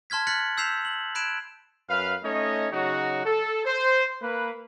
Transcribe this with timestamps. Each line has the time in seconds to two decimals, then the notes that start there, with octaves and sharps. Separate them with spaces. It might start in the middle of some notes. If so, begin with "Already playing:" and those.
0.10 A5 C6 F6 G#6 B6
0.27 F6 F#6 A6 B6 C#7 F#7
0.57 E6 G6 B6 C7 E7 F7
0.85 F#7
1.15 B5 F#6 G#6 D7 E7
1.89 F#2 B4 F5
2.24 A3 C#4 D#4 C#5 D#5
2.72 C#3 F#3 D#4 F#4
3.25 A4
3.65 C5
4.22 A#3 B4